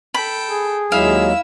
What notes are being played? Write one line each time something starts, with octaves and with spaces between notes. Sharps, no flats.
A4 G5 B5
G#4
D#2 F#3 G#3 E4 F5 E6